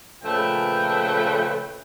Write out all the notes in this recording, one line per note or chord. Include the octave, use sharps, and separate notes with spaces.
A#2 C#3 F3 A3 B4 G5